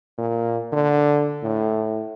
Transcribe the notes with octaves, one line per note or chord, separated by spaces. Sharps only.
A#2
D3
A2